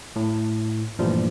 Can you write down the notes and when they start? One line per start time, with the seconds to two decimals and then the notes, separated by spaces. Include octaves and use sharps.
0.16 A2
0.99 G2 A#2 E3 F3 G3 A3